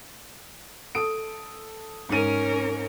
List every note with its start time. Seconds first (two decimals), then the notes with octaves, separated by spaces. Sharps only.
0.95 A4 D#6 D7
2.09 G#2 C#4 A#4 D#7